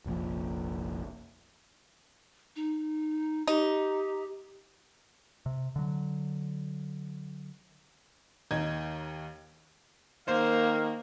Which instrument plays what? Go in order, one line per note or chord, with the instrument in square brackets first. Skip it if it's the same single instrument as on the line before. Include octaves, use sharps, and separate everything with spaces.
[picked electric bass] F1 A#1 A#2 F3
[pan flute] D#4
[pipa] D#4 [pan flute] G4
[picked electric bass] C3
D3 F#3
[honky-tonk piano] D#2 D#4 G#6
[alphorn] D#3 [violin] A#3 [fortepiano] C5 [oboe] F5